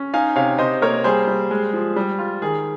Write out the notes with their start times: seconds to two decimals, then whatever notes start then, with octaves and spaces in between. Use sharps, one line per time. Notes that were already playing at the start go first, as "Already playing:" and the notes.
Already playing: C#4
0.13 D#4 F5 G#5
0.36 C3 C#5 F5
0.59 C3 C5 D#5
0.82 A#3 A#4 C#5
1.04 G3 G#4 C5
1.27 G3
1.51 G#3
1.74 F3
1.96 G3
2.19 F4
2.42 D#3 G#4